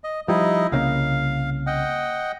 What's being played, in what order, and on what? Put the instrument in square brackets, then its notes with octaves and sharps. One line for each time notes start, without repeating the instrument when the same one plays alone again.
[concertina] D#5
[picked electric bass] F3 G3 [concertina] D#4 E4 D#5
[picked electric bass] C2 C#3 A#3 [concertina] F5
[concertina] D#5 F#5 G5